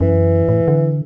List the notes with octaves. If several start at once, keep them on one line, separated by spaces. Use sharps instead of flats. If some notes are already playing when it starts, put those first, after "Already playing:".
F#2 E3
A2
D3